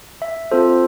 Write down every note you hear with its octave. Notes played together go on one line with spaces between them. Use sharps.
E5
C4 F4 A4 C5